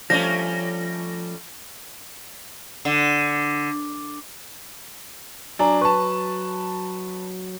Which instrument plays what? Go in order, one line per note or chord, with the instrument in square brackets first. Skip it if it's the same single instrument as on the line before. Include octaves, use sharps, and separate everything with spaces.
[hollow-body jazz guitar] F3 [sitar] G3 A3 C#4 [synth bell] A#6
[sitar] D3
[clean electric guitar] F#3 [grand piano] D4 [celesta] G#5 A#5
[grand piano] B4 A5 [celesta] C#6